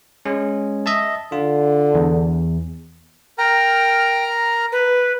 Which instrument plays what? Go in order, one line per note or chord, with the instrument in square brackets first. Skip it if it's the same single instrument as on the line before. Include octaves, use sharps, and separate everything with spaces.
[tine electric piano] G#3 C#4
D#5 E5 A5
[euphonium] D3 [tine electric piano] F4
[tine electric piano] E2
[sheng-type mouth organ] A#4 A#5 F6 [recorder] G5
[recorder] B4